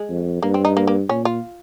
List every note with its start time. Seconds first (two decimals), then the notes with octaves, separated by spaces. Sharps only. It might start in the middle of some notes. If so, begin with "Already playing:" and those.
Already playing: G#3
0.10 F2
0.43 G2 A#3
0.54 C4
0.65 D#4
0.77 A#3
0.87 A#3
1.09 A#2 C#4
1.25 F4